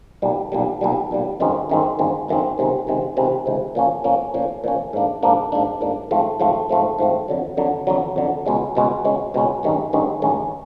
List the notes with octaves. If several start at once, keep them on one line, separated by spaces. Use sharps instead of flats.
B1 A#2 G3
B1 A#2 G3
B1 A#2 G3
B1 A#2 G3
G1 F#2 D#3 G#3 C4
G1 F#2 D#3 G#3 C4
G1 F#2 D#3 G#3 C4
G1 F#2 D#3 G#3 C4
C#2 C3 D#3 G#3 C4
C#2 C3 D#3 G#3 C4
C#2 C3 D#3 G#3 C4
C#2 C3 D#3 G#3 C4
A#2 F3 A#3 C#4
A#2 F3 A#3 C#4
A#2 F3 A#3 C#4
A#2 F3 A#3 C#4
G#2 F3 A#3 D4
G#2 F3 A#3 D4
G#2 F3 A#3 D4
G#2 F3 A#3 D4
G#2 F3 A3 C4
G#2 F3 A3 C4
G#2 F3 A3 C4
G#2 F3 A3 C4
F2 D3 F#3
F2 D3 F#3
F2 D3 F#3
F2 D3 F#3
C#2 B2 G#3 C#4
C#2 B2 G#3 C#4
C#2 B2 G#3 C#4
C#2 B2 G#3 C#4
A1 G2 D#3 G#3 C#4
A1 G2 D#3 G#3 C#4
A1 G2 D#3 G#3 C#4